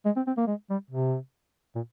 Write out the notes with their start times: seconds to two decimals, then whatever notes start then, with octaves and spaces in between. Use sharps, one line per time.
0.05 G#3
0.16 C4
0.27 C4
0.37 A#3
0.47 G#3
0.70 G3
0.91 C3
1.75 A#2